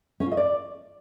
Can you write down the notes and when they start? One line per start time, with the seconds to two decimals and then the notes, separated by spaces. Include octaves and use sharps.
0.20 C#4
0.26 F4
0.32 D#5
0.37 D5